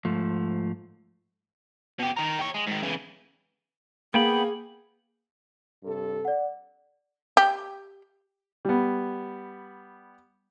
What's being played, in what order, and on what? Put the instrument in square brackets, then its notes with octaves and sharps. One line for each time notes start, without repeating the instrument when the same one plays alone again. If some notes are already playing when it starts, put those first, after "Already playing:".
[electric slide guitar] G#2 F3 A3
[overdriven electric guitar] B2 G4
D#3 A#4
G4 C#5
G#3
G#2 D#3
C#3 E3
[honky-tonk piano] A#3 [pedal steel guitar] B3 G5 B5 [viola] G#4
[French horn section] G2 C3 A4
[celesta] D5 F#5
[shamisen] G4
[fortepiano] G3 B3